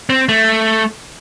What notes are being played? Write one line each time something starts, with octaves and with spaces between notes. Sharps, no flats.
C4
A3